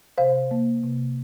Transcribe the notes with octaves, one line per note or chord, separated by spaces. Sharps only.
C3 C5 F5
A#3
C3